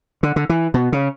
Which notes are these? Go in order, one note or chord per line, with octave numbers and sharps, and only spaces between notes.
D3
D3
E3
B2
C#3